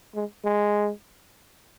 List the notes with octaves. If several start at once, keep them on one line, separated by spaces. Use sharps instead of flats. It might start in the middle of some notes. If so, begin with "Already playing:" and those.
G#3
G#3